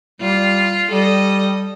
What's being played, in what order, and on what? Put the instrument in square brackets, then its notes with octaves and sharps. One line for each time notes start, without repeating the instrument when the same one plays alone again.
[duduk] G3 [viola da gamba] F4
[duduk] G3 [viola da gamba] A4 D#5